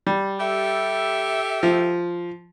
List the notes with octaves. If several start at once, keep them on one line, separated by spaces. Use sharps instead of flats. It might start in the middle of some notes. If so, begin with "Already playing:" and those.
G3
G4 A4 E5
F3